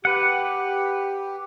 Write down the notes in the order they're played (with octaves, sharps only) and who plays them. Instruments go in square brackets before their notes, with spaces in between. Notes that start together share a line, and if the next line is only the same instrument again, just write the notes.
[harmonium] G4 [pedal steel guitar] B4 F#5